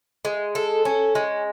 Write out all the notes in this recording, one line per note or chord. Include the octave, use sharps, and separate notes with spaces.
G#3
A4
C#4
G#3